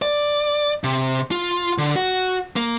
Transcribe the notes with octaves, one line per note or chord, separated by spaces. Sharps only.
D5
C3
F4
D3
F#4
A#3